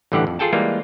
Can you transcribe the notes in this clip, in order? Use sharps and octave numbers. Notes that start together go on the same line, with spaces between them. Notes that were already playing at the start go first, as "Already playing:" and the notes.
A1 G2 D3 E3 G4 F#5
F2
F4 G#4 A4 G5 A5
E3 G3 G#3 A#3 F4